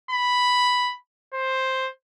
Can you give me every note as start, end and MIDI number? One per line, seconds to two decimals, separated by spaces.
0.11 0.94 83
1.34 1.89 72